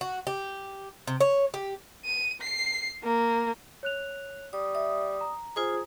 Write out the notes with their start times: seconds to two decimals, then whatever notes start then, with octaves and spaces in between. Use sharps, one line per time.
0.01 F#4
0.27 G4
1.07 C3
1.20 C#5
1.54 G4
2.05 D#7
2.41 C7
3.03 A#3
3.83 C#5 F#6 F7
4.53 G3 D#6
4.75 E5 D#6
5.21 A#5
5.56 F4 G#4 C5 G#5